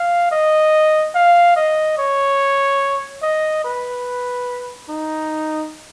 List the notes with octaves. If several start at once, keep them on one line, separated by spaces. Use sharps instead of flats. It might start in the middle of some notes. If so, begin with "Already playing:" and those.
Already playing: F5
D#5
F5
D#5
C#5
D#5
B4
D#4